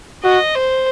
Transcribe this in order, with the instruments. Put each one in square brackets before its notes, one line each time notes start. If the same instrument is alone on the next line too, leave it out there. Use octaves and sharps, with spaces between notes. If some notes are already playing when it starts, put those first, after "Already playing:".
[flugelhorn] F#4 [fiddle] D#5
[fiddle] C5